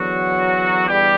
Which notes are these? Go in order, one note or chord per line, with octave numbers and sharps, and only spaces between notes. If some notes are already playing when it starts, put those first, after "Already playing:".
Already playing: E2 D3 F#3 F#4
G3 G4